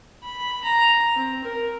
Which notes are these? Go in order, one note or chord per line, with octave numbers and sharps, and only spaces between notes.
B5
A#5
C4
A#4